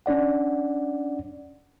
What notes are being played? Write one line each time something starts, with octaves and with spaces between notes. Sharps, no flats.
C#4 D4 D5 F#5